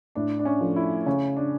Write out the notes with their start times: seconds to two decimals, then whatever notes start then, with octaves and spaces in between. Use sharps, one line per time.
0.15 A2 D4
0.39 D4
0.45 C#4
0.61 F3 A3
0.76 E4
1.06 C#3 C#4
1.37 D4